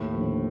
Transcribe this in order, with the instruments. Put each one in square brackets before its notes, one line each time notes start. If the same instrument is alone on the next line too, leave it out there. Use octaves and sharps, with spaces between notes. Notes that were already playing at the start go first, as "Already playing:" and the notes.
Already playing: [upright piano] D#2 [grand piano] A2
[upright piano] D3 F3